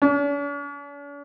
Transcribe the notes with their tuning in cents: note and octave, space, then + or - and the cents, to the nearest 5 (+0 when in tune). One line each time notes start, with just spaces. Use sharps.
D4 -45